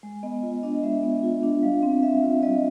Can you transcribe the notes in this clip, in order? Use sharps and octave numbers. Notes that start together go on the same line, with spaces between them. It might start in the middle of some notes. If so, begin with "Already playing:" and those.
G#3
B3 D#5
F4
D4 D#5
G#3 E5
B3
F4
D4
G3 F5
C4
G3 E5
F4
G3 D#5